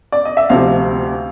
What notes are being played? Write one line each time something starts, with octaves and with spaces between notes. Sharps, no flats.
D5
D#5
E5
D2 C3 F3 F5